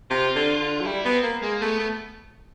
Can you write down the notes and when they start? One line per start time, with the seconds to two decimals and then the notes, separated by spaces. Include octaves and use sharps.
0.10 C3 F4
0.35 D3
0.60 D3
0.80 F#3
0.85 G3 E4
1.04 B3 C4
1.23 A#3
1.42 G#3 A#3
1.61 A3 B3
1.79 A3